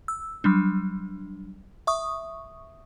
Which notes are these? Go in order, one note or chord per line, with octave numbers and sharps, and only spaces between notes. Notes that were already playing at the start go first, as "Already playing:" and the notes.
E6
F#3 G3 D4
E5 C#6 D#6